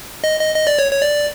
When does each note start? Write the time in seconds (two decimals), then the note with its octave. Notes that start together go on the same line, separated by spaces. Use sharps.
0.24 D#5
0.40 D#5
0.56 D#5
0.67 D5
0.79 C#5
0.91 C#5
1.02 D5